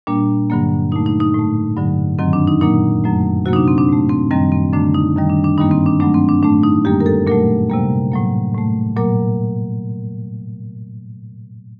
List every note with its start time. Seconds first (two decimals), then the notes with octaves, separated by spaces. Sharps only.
0.07 A#2 G3 A#3 D4
0.50 G2 D3 F#3 A#3
0.92 A#2 A3 D#4
1.06 D#4
1.20 D#4
1.34 A2 A3
1.77 G2 D3 F#3
2.19 F#2 D#3 F#3 C4
2.33 D4
2.48 D#4
2.61 A#2 F#3 A#3 D#4
3.04 F#2 F#3 A3
3.45 C3 F#3 A#3 F#4
3.53 D#4
3.56 D4
3.68 C4
3.78 D4
3.88 A2 A3
4.09 C4
4.31 F#2 D#3 G3 C4
4.52 C4
4.73 F#2 D3 A3 D4
4.94 D#4
5.16 F#2 D#3 G3
5.30 D4
5.44 D4
5.58 G2 D#3 G3 A#3 D#4
5.71 C4
5.86 D4
6.00 G2 F#3 A3 D4
6.14 C4
6.29 D4
6.43 A2 A3 D4
6.63 D#4
6.85 F#2 D3 G3 A#3 G4
7.00 A#4
7.06 A4
7.27 A#2 F#3 A3 A#4
7.70 C3 G3 A#3
8.12 A2 F#3 A#3
8.55 A2 A3
8.97 A#2 F#3 A#3 A#4